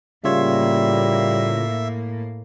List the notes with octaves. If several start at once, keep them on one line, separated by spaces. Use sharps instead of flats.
A2 C#3 G3 A#3 F4 C#5 E5